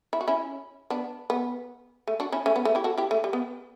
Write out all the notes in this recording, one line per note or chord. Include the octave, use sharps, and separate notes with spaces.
E4
F#4
C#4 E4
B3 D4
B3
A3
D4 F#4
C#4 E4
A3 C#4
B3
A3
E4 G4
F#4 A4
E4 G4
A3
G3
B3